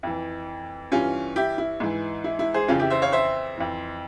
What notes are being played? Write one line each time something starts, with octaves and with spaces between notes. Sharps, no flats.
F2 E3
G2 E3 C#4 F4
E4 G4
E4
G#2 E3
E4
E4
G#4 C5
F2 C#3 E3 C#4 F4
E4 G4
C5 E5
C#5 F5
C5 E5
F2 E3